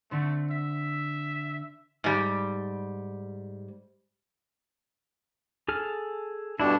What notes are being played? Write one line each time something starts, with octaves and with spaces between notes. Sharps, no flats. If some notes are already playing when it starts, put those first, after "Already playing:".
D3 A3 C4
E5 B6
G#2 G3
G#4 A4 F6
G2 B2 D4 E4 A4